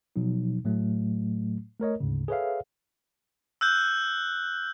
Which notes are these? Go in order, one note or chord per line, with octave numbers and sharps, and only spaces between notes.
B2 F3 F#3 D#4
A2 F#3 A3
A3 A#4 C#5 D#5
D2 G#2 C#3
G#4 A4 B4 C#5 E5 F5
E6 F#6 G6